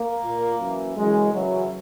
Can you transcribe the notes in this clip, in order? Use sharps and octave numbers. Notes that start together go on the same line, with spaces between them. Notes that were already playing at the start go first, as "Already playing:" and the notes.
Already playing: A#3
A#2
F#2 E3
F#2 C#3 E3 G#3
F#2 C#3 E3 F#3